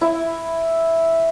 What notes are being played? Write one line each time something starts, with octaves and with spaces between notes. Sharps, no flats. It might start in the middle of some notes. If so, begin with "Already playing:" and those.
E4